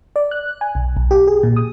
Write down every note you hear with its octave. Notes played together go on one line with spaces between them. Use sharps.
D5
F#6
G#5
B1
B1
G4
G#4
A#2
D#6